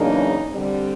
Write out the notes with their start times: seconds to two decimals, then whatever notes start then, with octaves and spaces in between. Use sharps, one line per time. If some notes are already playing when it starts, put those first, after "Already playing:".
Already playing: E2 C#3 F#3 A#3 D4 D#4
0.51 D3 G3 C4